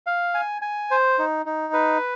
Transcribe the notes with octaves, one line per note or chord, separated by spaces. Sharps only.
F5
G#5
G#5
C5
D#4
D#4
B4